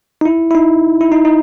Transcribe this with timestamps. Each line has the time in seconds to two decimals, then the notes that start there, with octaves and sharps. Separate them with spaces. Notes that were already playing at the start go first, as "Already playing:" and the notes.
0.21 D#4
0.25 E4
0.51 E4
0.55 D#4
1.01 E4
1.12 D#4
1.25 D#4